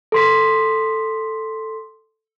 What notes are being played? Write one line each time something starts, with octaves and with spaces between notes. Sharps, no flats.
A4 C6 B6